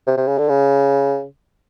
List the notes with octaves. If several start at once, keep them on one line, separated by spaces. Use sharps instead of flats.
C3
C3
C#3
D3
C#3